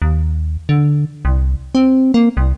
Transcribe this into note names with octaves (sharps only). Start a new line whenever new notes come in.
D#2
D3
C2
C4
A#3
C2